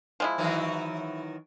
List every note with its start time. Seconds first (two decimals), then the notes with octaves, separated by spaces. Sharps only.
0.20 F3 G#3 E4
0.38 D#3 E3 F#3